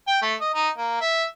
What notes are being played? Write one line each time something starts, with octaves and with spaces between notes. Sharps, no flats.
G5
A3
D#5
D#4
A#3
E5